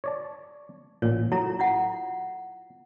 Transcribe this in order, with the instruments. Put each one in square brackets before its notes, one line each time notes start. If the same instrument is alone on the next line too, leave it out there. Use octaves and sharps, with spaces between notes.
[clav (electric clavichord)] C#5 D5 A5
[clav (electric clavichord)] A1 A#2 [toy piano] C#5
[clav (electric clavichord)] F#3 [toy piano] E4 A4 A#5
[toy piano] E4 F4 F#5